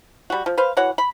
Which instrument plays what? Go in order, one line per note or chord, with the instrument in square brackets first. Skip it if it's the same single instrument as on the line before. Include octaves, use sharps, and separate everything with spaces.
[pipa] G3 F#4
F3
B4 C5 F5
E3 F#4 C#5 F#5
B5